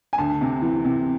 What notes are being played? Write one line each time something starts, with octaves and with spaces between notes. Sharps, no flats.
G#5
D2 A5
C3
E3
C3